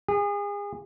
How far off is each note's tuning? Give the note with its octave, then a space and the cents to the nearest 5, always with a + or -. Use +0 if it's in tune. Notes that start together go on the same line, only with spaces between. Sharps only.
G#4 -35